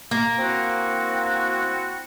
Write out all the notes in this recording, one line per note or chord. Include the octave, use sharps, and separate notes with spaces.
A#3
C4 E4 F#4